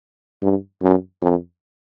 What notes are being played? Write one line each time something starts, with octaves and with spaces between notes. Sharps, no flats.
G2
F#2
F2